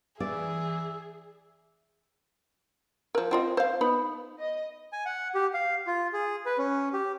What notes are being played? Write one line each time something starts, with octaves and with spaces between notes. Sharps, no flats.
E3 G#4 D5 E5
F3 A#4
C4 F4 D#5
C5 F5
B3 D#4 B5
D#5
G#5
F#5
G4
F5
F4
G#4
B4
C#4
G4